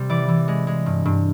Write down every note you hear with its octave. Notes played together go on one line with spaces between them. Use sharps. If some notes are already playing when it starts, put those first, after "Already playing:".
Already playing: C3 G3
E3 D5
E3
G#3
G#3
G2
G2